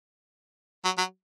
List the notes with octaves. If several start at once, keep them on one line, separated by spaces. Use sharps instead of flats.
F#3
F#3